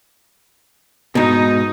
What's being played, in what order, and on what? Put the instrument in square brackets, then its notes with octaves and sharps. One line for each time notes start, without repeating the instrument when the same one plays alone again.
[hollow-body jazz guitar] G#2 B2 [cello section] D#4